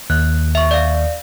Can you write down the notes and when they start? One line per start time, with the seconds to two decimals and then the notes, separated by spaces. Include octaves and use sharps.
0.10 D#2 F#6
0.55 E5 C#6
0.71 D5 F5